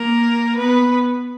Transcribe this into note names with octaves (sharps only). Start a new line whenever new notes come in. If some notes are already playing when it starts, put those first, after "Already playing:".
Already playing: A#3 A#4
B3 B4